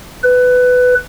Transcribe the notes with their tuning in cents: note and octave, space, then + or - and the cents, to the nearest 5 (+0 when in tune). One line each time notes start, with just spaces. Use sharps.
B4 +15